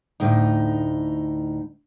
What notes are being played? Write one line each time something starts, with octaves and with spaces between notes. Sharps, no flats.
D2 A2 D#4